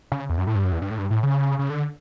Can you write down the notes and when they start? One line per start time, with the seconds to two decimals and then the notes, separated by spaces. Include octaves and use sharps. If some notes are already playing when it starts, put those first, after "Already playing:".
0.12 C#3
0.30 E2
0.38 F#2
0.47 A2
0.55 G2
0.64 F#2
0.72 E2
0.82 G2
0.91 A2
0.99 G2
1.11 A2
1.23 C#3
1.59 C#3
1.70 D3